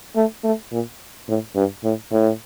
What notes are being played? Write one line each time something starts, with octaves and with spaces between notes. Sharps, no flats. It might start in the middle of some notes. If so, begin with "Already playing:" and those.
A3
A3
A#2
A2
G2
A2
A2